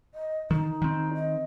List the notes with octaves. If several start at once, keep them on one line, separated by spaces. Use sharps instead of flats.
D#5
D#3 D#4
D#3 C4
D#5